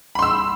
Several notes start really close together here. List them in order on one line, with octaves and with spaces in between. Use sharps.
B5 C6 E6